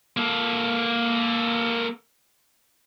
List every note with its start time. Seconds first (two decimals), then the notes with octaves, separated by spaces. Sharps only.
0.17 A#3 A4